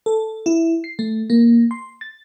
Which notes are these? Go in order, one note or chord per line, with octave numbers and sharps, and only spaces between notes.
A4
E4
C7
A3
A#3
C6
A6